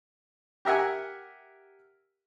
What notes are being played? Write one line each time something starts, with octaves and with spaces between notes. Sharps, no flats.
G4 A#4 E5 F#5 G#5